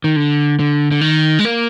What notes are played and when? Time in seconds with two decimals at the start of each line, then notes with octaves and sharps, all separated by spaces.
0.04 D#3
0.16 D3
0.59 D3
0.91 D3
1.01 D#3
1.39 G#3
1.45 A#3